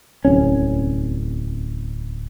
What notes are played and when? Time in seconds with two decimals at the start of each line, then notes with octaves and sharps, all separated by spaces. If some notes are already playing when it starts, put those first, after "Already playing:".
0.25 D1 C2 C#4